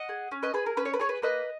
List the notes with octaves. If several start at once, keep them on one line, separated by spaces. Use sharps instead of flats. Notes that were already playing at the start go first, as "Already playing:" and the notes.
Already playing: D#5 F#5
G#4
C#4
B4 D#5
G#4 B4
A#4
C#4 B4
C#5
B4
G#4 C#5
B4
A#3 B4 D#5